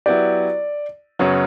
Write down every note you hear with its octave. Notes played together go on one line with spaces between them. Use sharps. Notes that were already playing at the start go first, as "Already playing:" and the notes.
F#3 B3 E4 G4 D5
F#2 C#3 F#3 B3 C#5